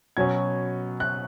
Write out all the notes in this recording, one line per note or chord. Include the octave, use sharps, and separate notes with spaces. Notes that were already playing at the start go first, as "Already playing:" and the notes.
B2 F#3 C#4 G#6
F#6